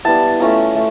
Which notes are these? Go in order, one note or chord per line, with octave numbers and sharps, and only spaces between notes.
G3 B3 E4 A5
A3 C#4 F4 A#5
A3